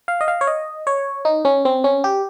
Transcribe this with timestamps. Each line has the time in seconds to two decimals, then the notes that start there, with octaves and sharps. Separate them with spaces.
0.08 F5
0.21 D#5
0.28 F5
0.41 C#5
0.47 D#5
0.87 C#5
1.25 D#4
1.45 C#4
1.65 C4
1.84 C#4
2.04 G4